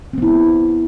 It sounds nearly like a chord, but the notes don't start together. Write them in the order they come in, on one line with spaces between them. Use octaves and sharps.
C4 B3 E4